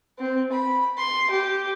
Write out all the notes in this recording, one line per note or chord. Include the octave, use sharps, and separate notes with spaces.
C4
B5
C6
G4